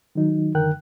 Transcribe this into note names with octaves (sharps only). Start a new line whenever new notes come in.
D#3 F#3 D#4
F#2 D3 D#3 A#4 G5 F#6